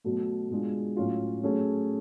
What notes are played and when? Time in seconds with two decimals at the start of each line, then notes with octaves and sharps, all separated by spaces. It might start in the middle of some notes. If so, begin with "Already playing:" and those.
0.04 B2 F#3 A3
0.50 B2 G#3 D4 F4 G#4
0.97 A2 F#3 C#4 F4
1.43 F#3 A3 C#4 G#4